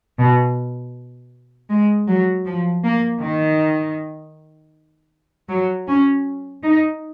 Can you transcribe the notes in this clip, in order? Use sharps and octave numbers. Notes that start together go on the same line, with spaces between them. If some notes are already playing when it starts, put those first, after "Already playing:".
B2
G#3
F#3
F3
A#3
D#3
F#3
C#4
D#4